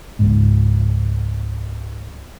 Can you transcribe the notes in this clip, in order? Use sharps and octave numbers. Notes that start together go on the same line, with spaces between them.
C#2 G#2